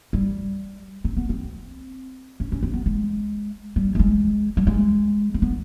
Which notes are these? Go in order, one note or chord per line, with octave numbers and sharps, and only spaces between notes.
G3
C4
B3
C4
C#4
C#4
C4
B3
G#3
G3
A3
G#3
G3
G#3
C4
B3